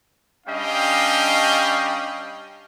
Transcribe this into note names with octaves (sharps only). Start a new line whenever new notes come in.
G3 C#4 D4 D#5 F5 G5